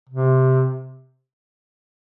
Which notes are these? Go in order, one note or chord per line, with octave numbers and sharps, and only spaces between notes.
C3